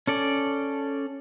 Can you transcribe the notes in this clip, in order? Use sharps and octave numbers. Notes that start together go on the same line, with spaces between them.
C#4 A4 D5